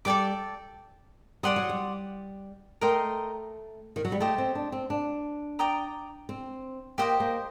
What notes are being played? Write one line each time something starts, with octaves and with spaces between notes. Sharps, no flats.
G3 A4 D5 G5 D6
G3 D5 F#5 C6 D#6
F#3
G3
A3 A#4 D#5 G5 C6
D#3
F#3
G3
A3 G4 C5 D#5 A5
C4
D4
C4
D4
D5 G5 A#5 D#6
C4
A#3 G4 C5 D#5 G5
A#3